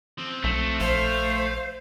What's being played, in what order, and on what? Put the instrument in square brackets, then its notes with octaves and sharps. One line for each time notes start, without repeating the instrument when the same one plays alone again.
[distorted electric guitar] F3 C4
[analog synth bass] B1 [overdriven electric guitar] A3
[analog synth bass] A#1 [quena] C5 [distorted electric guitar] F5